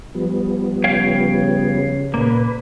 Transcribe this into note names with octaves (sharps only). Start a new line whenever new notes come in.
F3 G3 B3
C#3 C#5 F5 G5
A#2 A#3 B4